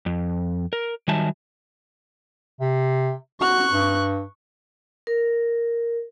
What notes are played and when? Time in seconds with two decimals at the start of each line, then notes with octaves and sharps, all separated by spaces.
0.06 F2
0.73 A#4
1.08 D#3 F#3 G3 E5 G#5 A5
2.61 C3
3.41 F#4 C#6 F#6
3.72 G2
5.07 A#4